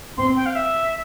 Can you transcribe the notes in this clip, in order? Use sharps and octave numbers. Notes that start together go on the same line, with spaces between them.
C4 C6
G5
F5
E5